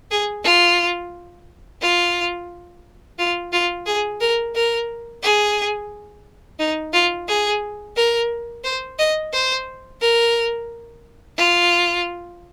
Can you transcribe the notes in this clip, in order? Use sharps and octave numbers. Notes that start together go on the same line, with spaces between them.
G#4
F4
F4
F4
F4
G#4
A#4
A#4
G#4
D#4
F4
G#4
A#4
C5
D#5
C5
A#4
F4